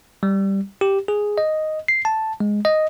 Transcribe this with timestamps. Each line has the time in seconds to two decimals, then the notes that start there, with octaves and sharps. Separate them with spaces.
0.23 G3
0.81 G4
1.08 G#4
1.38 D#5
1.88 C7
2.05 A5
2.40 G#3
2.65 D#5